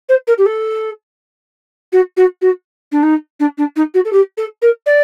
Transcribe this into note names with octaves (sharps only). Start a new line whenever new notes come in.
C5
A#4
G4
A4
F#4
F#4
F#4
D4
D#4
D4
D4
D#4
F#4
A4
G4
A4
A#4
D5